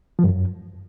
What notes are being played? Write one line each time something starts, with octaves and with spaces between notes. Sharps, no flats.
F3
G2
F#2